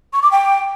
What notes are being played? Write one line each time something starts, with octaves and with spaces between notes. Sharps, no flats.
C#6
D6
G5